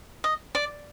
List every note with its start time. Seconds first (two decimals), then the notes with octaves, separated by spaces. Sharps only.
0.24 D#5
0.55 D5